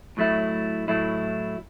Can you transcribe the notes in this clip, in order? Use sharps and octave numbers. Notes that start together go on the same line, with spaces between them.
A2 F#3 A3 E4
A2 F#3 A3 E4